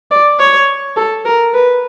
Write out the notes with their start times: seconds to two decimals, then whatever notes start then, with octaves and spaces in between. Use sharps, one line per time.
0.11 D5
0.40 C#5
0.97 A4
1.25 A#4
1.54 B4